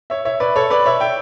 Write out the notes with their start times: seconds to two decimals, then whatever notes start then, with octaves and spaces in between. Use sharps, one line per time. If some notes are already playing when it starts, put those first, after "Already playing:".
0.10 C#5 E5
0.25 C#5 E5
0.40 B4 D5
0.56 A4 C#5
0.70 B4 D5
0.86 C#5 E5
1.01 E5 G5